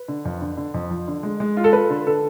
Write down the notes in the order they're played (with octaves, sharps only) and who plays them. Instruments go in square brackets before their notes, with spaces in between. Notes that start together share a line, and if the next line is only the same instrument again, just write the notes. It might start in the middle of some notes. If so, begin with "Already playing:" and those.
Already playing: [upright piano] B4
[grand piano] D3
F2
D3
D3
F2
F3
D3
G#3
G#3
F4
[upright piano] A4
[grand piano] F4 [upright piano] B4
[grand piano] D3
[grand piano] D3 [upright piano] A4